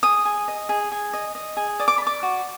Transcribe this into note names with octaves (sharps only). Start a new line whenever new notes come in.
G#4 D#6
G#4
D#5
G#4
G#4
D#5
D#5
G#4
D5 D#6
D6
B5
D5 D6
F#4